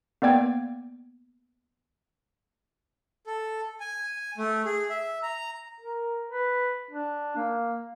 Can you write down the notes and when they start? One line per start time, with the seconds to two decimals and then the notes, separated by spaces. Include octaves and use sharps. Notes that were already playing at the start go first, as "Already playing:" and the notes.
0.22 A#3 B3 D5 G5 G#6
3.27 A4
3.80 G#5
4.38 A3
4.65 G#4
4.90 E5
5.23 A#5
5.80 A#4
6.31 B4
6.91 D4
7.36 A#3